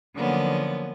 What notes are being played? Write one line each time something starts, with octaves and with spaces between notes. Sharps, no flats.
D3 F3 F#3 A#3 B3 C#4